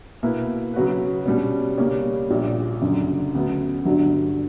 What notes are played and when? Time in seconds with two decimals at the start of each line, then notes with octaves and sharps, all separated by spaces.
0.23 B2 A#3 E4 B4
0.74 C#3 F#3 C#4 F#4 B4
1.26 B2 G3 C#4
1.78 C#3 G3 A#3 C#4 G4
2.30 A#1 A#2 A#3
2.82 F#1 F#2 D3
3.34 D2 C#3 F#3 B3
3.85 G1 G2 D3 F#3